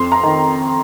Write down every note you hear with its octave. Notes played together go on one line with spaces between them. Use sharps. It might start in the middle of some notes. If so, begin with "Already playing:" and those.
Already playing: F2 C6
A#5
D#3